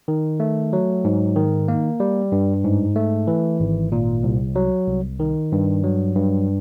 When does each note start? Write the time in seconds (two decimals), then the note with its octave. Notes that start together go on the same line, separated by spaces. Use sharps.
0.08 D#3
0.40 A3
0.73 F#3
1.04 G#2
1.36 D#3
1.68 A#3
2.00 G3
2.32 G2
2.64 G#2
2.96 A3
3.27 E3
3.60 G#1
3.92 A#2
4.23 C2
4.56 F#3
4.88 C2
5.20 D#3
5.52 G2
5.84 F#3
6.15 G2